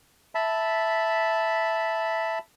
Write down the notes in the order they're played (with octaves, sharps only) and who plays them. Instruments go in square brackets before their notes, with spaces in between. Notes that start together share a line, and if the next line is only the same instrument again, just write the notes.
[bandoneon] E5 A5 B5